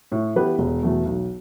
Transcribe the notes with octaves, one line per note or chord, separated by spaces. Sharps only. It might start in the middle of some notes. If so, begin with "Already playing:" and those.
A2
E3 B3 G4 B4
E1
E2 B2 A3
B1